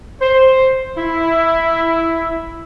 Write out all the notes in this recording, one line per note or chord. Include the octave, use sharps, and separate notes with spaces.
C5
E4